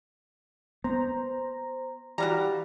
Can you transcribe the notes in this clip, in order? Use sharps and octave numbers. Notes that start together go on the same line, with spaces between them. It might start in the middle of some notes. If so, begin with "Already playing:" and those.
B3 C5 A#5
E3 G3 F#4 F5 A#5